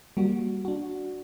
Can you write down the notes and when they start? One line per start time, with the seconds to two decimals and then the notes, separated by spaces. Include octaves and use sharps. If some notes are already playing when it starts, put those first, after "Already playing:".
0.17 G3 A#3 F#4
0.65 D4 F#4